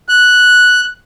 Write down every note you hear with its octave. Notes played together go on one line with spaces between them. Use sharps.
F#6